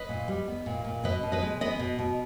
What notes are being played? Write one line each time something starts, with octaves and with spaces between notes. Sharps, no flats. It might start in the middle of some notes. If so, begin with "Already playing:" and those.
Already playing: B4 D#5
A#2
G3
B3
A#2
A#2
B2 B4 D#5
B2
B4 D#5
G#3
B3 B4 D#5
B2
B2